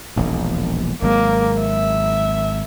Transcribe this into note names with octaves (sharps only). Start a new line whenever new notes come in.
E1 A#1 D#2
G#1 F#3 G#3 A#3
E5